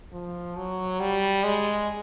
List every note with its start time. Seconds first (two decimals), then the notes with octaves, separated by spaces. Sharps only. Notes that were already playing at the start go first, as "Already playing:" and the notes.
0.13 F3
0.56 F#3
1.00 G3
1.44 G#3